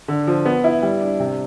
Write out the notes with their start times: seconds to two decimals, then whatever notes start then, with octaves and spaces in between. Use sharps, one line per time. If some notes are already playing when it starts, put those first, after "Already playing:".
0.08 D3
0.27 F3
0.46 B3
0.64 E4
0.82 G3
1.01 D4
1.20 C3